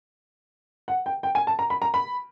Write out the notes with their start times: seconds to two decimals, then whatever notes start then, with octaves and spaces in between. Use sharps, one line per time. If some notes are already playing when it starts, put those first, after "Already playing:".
0.88 F#5
1.06 G5
1.23 G5
1.35 G#5
1.47 A5
1.59 A#5
1.70 B5
1.82 A#5
1.94 B5